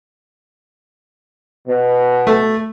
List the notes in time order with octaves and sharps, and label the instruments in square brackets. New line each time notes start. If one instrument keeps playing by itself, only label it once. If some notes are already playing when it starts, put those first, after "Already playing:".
[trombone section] B2
[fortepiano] A3